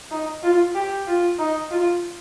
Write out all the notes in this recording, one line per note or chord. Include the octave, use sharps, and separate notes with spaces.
D#4
F4
G4
F4
D#4
F4